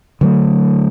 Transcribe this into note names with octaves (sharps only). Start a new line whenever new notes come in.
D3 F#3 A3